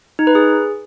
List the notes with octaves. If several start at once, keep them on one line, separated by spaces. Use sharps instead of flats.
D#4
B4
G#4